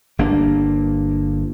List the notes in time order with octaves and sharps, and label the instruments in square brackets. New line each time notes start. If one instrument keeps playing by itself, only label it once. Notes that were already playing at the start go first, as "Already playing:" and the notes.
[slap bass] G1 A#3 D4